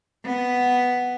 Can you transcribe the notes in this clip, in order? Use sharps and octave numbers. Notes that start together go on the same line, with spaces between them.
B3